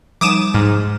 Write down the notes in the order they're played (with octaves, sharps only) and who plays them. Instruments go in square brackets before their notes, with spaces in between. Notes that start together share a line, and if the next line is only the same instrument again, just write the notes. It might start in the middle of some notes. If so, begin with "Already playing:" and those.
[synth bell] F3 G3 D#4 [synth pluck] D6 D#6 E7
[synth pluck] G#2 [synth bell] F6